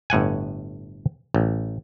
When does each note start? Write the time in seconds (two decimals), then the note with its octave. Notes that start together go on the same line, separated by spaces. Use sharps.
0.10 G1 A2 F#5 G#5
1.34 A1